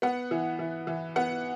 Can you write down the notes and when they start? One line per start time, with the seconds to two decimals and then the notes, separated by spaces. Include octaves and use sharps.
0.02 B3 F#5
0.31 E3
0.59 E3
0.87 E3
1.16 B3 F#5